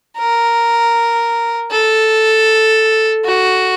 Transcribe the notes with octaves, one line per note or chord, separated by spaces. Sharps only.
A#4
A4
F#4